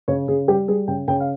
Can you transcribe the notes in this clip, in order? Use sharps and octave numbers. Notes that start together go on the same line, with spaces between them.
C#3 C#5
C#3 G#4
G3 G4
G3 G#4
C#3 G5
C#3 G5
F5